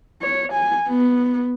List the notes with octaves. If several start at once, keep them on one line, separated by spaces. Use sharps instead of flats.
C#5
G#5
B3